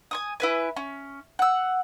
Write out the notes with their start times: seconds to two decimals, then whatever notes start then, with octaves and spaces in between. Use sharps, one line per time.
0.11 G#5 C#6 D#6
0.40 E4 B4 G#5
0.76 C#4
1.39 F#5 E6